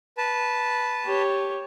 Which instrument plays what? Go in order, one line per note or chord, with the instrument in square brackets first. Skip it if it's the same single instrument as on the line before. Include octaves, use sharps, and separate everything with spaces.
[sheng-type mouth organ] B4 A5
[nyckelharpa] G4 C#5